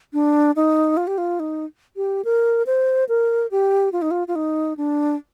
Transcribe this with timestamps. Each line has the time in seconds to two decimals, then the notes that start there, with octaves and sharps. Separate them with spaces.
0.13 D4
0.56 D#4
0.97 F4
1.07 G4
1.18 F4
1.40 D#4
1.96 G4
2.25 A#4
2.66 C5
3.09 A#4
3.51 G4
3.93 F4
4.02 D#4
4.11 F4
4.28 F4
4.36 D#4
4.77 D4